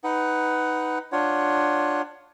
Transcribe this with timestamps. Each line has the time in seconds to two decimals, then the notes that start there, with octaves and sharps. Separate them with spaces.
0.04 D#4 B4 F#5
1.12 D4 F4 C#5 F#5